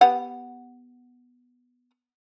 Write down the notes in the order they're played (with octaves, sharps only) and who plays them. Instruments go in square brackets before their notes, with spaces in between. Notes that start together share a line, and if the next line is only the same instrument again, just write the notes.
[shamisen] B3 G4 F#5